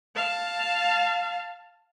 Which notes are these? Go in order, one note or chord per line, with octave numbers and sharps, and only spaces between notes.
F5 A5